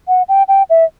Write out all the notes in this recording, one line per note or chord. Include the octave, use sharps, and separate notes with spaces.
F#5
G5
G5
E5